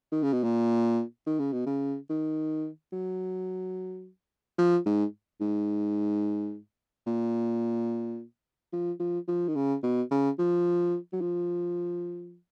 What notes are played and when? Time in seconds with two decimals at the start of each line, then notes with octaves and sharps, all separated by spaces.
0.12 D#3
0.23 C#3
0.33 B2
0.43 A#2
1.26 D#3
1.39 C#3
1.53 B2
1.66 C#3
2.09 D#3
2.92 F#3
4.58 F3
4.86 G#2
5.41 G#2
7.07 A#2
8.73 F3
9.00 F3
9.28 F3
9.48 D#3
9.55 C#3
9.83 B2
10.11 C#3
10.39 F3
11.13 F#3
11.21 F3